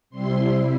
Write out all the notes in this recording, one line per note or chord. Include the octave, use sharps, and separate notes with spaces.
C3 G3 C4 E4 C6